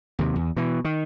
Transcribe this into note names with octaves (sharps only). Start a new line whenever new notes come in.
D#2 C3
E2
B2 E3
D#3